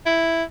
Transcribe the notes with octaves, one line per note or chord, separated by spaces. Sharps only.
E4